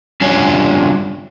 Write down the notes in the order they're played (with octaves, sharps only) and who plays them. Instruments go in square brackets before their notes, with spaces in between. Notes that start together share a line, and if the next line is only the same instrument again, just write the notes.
[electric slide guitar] G3 C#4 D4 F4 C#5 G#5